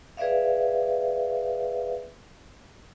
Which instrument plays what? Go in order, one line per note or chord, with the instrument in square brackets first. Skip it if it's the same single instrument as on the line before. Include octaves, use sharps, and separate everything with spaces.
[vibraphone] G#4 B4 D5 E5 F5